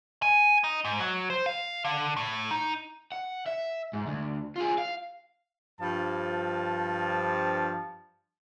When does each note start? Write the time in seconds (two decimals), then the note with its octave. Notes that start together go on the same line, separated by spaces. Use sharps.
0.22 G#5
0.64 D#4
0.85 G#2
1.00 F#3
1.30 C5
1.46 F5
1.84 D3
2.17 A2
2.51 D#4
3.12 F#5
3.46 E5
3.93 G#2
4.07 D2
4.56 F4 G#4
4.78 F5
5.80 G2 F3 A5